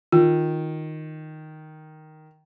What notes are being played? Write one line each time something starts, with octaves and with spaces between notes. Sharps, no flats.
D#3 F4